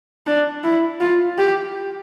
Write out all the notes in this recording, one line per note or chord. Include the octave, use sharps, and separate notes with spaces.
D4
E4
F4
G4